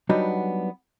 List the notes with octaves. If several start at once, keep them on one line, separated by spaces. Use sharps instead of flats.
F#3 G3 B3 D4 D#4 F#4